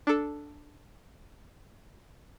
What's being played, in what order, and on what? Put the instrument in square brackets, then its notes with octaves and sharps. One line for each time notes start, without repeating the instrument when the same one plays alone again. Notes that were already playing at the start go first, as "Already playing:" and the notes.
[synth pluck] D4 A4